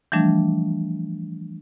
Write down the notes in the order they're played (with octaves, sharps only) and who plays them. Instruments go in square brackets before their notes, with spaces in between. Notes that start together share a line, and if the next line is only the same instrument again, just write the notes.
[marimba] E3 F3 G3 A3 D4